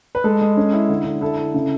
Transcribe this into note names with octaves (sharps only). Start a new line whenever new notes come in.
B4
G#3 A4
G#3
C#4
E4
D3
D3
E4 A4
E4
C#3